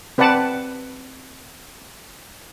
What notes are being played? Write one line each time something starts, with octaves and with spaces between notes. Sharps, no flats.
C4 B4 D5 F#5 A5